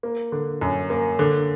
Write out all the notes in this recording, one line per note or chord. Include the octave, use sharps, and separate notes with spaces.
A#3
D3
F#2
A#3
D3